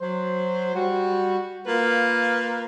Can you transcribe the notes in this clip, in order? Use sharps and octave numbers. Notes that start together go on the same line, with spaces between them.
F#3 C5
G3 F#4
A#3 F4 B4